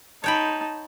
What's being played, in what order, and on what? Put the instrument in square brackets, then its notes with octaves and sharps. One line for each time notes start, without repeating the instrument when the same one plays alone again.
[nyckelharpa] D#4 A5 [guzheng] C#5 G5 B5